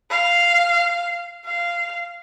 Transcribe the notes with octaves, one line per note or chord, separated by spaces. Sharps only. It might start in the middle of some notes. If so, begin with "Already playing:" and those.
F5
F5